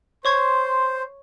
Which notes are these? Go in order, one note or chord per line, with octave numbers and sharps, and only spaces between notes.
C5 C#5 C6 C#6 G#6